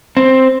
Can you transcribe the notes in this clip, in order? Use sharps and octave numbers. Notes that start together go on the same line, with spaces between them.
C4